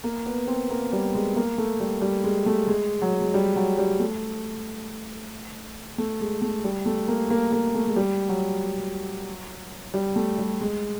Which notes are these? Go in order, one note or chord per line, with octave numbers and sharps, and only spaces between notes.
A#3
B3
C4
A#3
G3
G#3
A#3
A3
G3
G3
G#3
A3
G#3
F#3
G#3
G3
F#3
G3
A3
A3
G#3
A3
G3
A3
A#3
A#3
A#3
A3
G#3
G3
F#3
G3
A3
G3
G#3